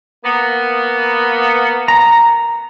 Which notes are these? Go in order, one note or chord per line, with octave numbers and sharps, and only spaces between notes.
A#3 B3
A#5